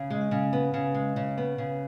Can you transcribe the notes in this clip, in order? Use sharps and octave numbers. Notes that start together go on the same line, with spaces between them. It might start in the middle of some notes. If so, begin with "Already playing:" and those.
Already playing: C#3
G#3
C#3
B3
C#3
G#3
C#3
B3
C#3